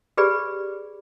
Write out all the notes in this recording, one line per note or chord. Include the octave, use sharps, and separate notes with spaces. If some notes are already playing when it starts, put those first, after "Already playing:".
G4 G#4 B4 D5 B5